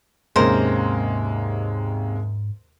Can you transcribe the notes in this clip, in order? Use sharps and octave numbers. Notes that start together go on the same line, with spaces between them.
D#2 G#2 C3 G#3 A#3 C#4 A#4 C5